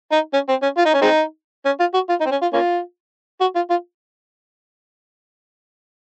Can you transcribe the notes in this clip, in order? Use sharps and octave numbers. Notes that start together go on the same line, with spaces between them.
D#4
C#4
C4
C#4
F4
D#4
C#4
G#3 C4 D#4
C#4
F4
F#4
F4
D#4
C4
C#4
F4
A#3 C#4 F4
F#4
F4
F4